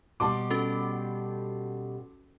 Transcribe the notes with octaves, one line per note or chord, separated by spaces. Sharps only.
B2 G3 G4 A5 C6 D6
C#4 F#4 A4